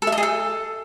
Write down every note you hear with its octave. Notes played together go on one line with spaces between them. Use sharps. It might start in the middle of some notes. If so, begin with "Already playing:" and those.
A4
E5
D#5
G#4
A4